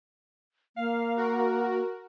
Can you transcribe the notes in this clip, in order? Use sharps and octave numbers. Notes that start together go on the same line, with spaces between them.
A#3 F5
F#4 A#4